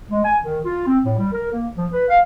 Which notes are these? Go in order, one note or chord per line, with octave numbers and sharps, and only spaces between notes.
G#3
G#5
D#3
F4
C4
A2
G3
A#4
A#3
F3
B4
F5